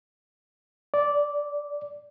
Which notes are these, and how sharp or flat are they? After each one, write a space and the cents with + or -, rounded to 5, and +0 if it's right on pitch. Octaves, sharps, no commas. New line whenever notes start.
D5 -10